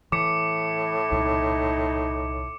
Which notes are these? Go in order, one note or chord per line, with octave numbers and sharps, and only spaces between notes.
A2 E3 D6 C#7
C2 A#2 D#4